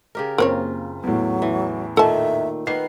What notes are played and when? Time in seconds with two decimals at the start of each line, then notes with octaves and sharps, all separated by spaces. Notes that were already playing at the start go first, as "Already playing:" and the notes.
0.15 C#3 G4 A#4
0.38 F#1 A#3 C4 F4 C#5
1.03 E2 A2 F#3
1.42 E3
1.97 A#2 D#3 A3 A4 E5 A5
2.67 D#3 B3 B4 C7